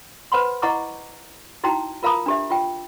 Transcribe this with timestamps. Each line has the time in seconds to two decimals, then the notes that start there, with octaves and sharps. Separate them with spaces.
0.32 B4 C5 F#5 B5 C6
0.62 E4 D#5 F#5 A#5 C#6 D6
1.64 D#4 E4 F#4 G5 A#5
2.03 F4 A#4 F5 A#5 B5 D#6
2.26 D4 G4 E5
2.51 F4 G5